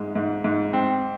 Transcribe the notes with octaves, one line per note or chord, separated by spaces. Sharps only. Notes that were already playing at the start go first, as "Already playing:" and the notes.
Already playing: G#2 G#3
G#2
G#2
C4